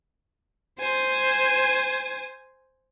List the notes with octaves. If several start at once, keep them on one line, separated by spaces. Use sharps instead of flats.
C5 G#5